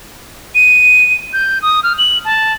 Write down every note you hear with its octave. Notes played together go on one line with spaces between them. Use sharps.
D#7
G6
D#6
F6
F#7
A5